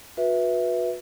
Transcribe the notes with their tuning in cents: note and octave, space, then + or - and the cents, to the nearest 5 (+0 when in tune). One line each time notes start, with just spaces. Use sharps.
F#4 -35 B4 -15 E5 +0